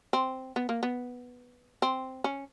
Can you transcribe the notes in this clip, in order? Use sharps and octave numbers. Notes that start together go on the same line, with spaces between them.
C4
B3
A#3
B3
C4
C#4